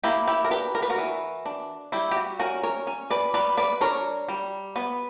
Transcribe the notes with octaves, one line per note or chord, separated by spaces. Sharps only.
A#3 E4 G4
E4 G4
A#4
D4 G4 B4
A#4
B4
F#4 A#4
E3
D4
G3 E4 G4
G4
F#4
C#4 F#4 A#4
A#4 C#5
C#4
B4 D5
G3 B4 D5
B4 D5
D4 A#4 C#5
G3
B3